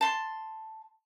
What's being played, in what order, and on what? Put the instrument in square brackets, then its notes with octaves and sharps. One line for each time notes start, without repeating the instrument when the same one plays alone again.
[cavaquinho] A5 C6